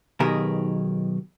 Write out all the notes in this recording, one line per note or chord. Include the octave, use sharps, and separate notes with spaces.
B1 B2 D#3 G4 G#4 A#4